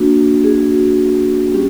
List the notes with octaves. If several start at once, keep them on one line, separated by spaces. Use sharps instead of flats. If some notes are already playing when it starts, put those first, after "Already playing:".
Already playing: A#3 D4 F#4
G#4
F#4
G3 C#4 G4